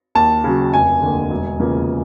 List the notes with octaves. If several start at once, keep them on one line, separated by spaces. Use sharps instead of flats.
D#2 A5
C#3 F#3
F1 G#5
D#2 D3
E1
E2 C#3 F3 A#3